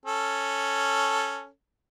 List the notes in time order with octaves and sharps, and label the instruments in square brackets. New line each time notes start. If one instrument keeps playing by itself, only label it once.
[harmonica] C#4 A4